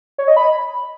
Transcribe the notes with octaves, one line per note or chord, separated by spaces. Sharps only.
C#5
D#5
B5